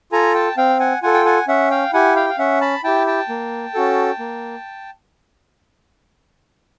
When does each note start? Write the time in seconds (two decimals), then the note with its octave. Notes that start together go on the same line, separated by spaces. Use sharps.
0.12 F4 A4 G#5 A#5
0.34 G5 A5
0.57 C4 F5 G5
0.80 F#5 G#5
1.02 F4 A4 F#5 G#5
1.14 G5
1.25 F#5 G#5
1.48 C#4 E5 F#5
1.71 F5 G5
1.93 E4 G4 F#5 G#5
2.16 F5 G5
2.30 F5
2.39 C#4 E5 F#5
2.61 A5 B5
2.84 E4 G4 G5 A5
3.07 G5 A5
3.29 A#3
3.74 C#4 F#4 A4
4.19 A#3